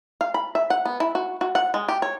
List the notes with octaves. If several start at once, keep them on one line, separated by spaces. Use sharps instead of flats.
F5
B5
E5
F#5
B3
E4
F#4
F#4
F#5
G#3
G4
C#5